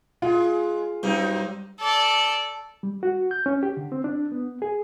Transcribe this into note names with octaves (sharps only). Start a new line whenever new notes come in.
G#3 F4
G2 F#3 C4 D#4
A4 D5
G3
F#4
G6
C#4
G4
D3
C4
D4
B3
G#4